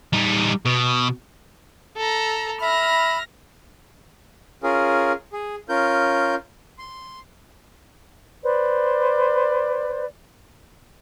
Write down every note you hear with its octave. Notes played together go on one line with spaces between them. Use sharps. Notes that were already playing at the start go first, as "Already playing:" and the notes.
G3 D#4
B2
A4 A#5
E5 B5 F6 A#6
C#4 F4 G#4 A#4
G#4
C#4 F4 A#4 G6
C6
B4 C5 D5